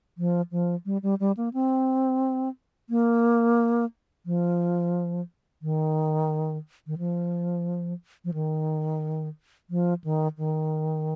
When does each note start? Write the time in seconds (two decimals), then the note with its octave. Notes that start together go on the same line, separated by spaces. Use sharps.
0.18 F3
0.52 F3
0.86 G3
1.03 G3
1.20 G3
1.37 A#3
1.54 C4
2.90 A#3
4.26 F3
5.62 D#3
6.87 D#3
6.98 F3
8.25 F3
8.34 D#3
9.70 F3
10.04 D#3
10.38 D#3